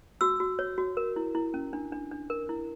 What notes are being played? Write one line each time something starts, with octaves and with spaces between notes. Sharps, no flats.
F#4 E6
F#4
C#5
F#4
A#4
E4
E4
C#4
D4
D4
D4
A#4
E4